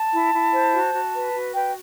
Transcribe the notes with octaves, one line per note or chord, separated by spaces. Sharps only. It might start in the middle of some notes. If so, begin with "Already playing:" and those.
Already playing: A5
E4
E4
C5
F#4
F#4
B4
F#4
B4 G5